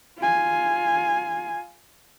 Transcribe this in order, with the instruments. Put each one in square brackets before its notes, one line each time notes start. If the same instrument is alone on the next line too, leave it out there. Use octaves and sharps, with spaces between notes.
[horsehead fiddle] F4 G#5